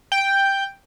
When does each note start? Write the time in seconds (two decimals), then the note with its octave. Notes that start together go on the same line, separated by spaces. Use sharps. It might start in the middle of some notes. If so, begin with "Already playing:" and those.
0.12 G5